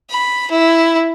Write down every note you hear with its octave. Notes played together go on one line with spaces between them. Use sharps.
B5
E4